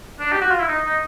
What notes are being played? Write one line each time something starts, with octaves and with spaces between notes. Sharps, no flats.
D4
G4
F#4
F4
E4
D#4
D#4